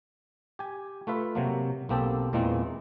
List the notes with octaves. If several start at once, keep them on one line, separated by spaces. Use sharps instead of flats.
G4 G#5
A3 F4 B4 E5
C3 F#3 A#3
B1 A#3 C4 G4 A4
E2 A#2 E3 G#3 A#3 C4